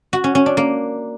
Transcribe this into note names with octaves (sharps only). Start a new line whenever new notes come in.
F#4
C#4
C#4
D4
A#3